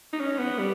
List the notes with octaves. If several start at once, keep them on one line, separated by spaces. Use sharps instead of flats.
D#4
C#4
B3
G3